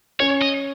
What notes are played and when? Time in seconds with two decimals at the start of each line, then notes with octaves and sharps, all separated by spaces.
0.20 C#4 C#5
0.42 D#5